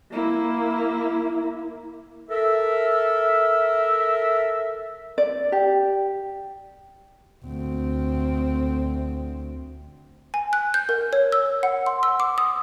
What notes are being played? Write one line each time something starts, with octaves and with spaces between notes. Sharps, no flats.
A#3 E4
A4 A#4 E5
D5
G4
D2 C4
G#5
F#6
G6
A#4
C#5
E6
F#5
C6
E6
D6
D#6